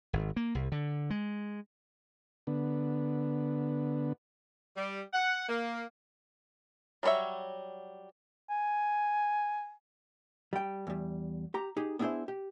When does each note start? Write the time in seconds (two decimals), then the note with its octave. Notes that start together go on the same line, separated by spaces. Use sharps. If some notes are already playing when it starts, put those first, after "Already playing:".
0.13 G#1
0.36 A#3
0.55 C2
0.72 D3
1.10 G#3
2.47 D3 B3
4.77 G3
5.14 F#5
5.49 A#3
7.03 F#3 G3 C#4 C#5 E5
8.50 G#5
10.53 G3 G5
10.87 E2 G3
11.54 G4 A#5
11.77 D#4 G4 G#4
11.99 B3 D4 E4 G#4 C5 E5
12.28 G4